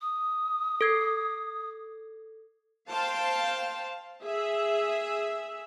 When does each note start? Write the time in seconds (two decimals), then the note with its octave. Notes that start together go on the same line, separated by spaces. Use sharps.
0.01 D#6
0.81 A4 G#6 C7
2.91 C5 F5 G5 A5
4.24 G#4 E5